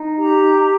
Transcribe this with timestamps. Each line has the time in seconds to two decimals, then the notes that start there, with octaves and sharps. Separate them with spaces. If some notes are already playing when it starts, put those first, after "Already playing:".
Already playing: D#4
0.17 G4 A#5